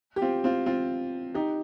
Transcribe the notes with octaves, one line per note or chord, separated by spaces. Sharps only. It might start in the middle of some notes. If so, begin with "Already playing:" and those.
G4
C4 F4
C4 F4
C4 F4
D#4 G4